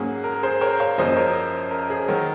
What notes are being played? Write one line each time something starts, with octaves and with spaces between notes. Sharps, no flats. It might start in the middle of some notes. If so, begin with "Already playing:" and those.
Already playing: G#2 F#3 A#3 C#4 G#4
A#4
G#4 C5
A#4 C#5
C#5 F5
F#2 C#3 F3 A#3 C#4 C5 D#5
C5
A#4 C#5
A#4
G#4
D#3 F#3 A#4